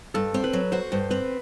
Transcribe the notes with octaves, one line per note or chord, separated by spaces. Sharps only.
G2 A4
C4
B4
F#3
F#4 C5
G2 C5
C4 B4